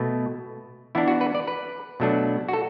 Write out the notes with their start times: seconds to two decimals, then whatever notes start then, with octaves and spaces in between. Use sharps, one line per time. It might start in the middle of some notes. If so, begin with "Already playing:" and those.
Already playing: B2 A3
0.95 E3 B3 D4 E4
1.08 F#4
1.21 B4
1.35 D5
1.47 B4
2.00 B2 F#3 A3 D4
2.49 F#4
2.53 A4